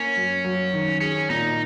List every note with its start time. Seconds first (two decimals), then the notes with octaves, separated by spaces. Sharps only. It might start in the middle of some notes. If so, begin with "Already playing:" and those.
Already playing: A#3 C#4
0.16 F#2
0.44 F#3
0.74 D#3
1.01 C#4 G#4
1.30 A#2 D#4